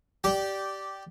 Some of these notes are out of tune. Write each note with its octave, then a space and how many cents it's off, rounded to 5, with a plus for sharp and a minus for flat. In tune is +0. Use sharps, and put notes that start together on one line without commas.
G4 -10 D5 +0 G5 -15